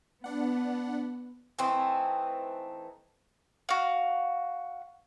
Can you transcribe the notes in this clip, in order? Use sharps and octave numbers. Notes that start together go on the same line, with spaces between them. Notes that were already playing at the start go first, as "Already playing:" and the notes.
B3 D4 F#5
E3 A3 C4 D#4
F#4 F5